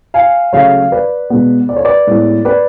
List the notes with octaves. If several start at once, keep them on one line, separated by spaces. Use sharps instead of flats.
F5 G#5
C#3 F#3 A3 C#5 F5
B4 D5
B2 G#3 B3
D5
C#5
B4 D5
A2 G#3 B3
B4 D5